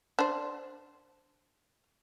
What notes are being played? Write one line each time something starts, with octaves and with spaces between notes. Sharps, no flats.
D4 C5